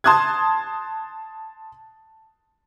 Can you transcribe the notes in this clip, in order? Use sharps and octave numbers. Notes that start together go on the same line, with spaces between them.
A5 C6 D#6 F#6 G#6